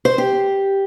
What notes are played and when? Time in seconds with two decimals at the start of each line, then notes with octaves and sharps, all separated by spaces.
0.05 C5
0.18 G4